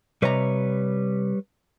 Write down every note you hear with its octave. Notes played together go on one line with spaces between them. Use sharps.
C3 G3 B4 C#5 D#5 A#5